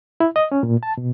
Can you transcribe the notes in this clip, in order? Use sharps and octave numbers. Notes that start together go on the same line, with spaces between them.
E4
D#5
C#4
A#2
A5
B2